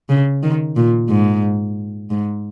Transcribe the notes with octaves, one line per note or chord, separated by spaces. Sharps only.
C#3
D#3
A#2
G#2
G#2